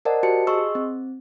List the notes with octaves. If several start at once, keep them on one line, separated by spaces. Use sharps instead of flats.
A#4 C5 D5 D#5 F#5 A5
F#4 G4 C5 D#5 A5 C#7
G#4 D#5 C6 C#6 E6
C4